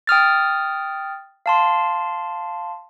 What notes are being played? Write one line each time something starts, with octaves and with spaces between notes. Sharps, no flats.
G5 D#6 F6 A6
F5 A5 C6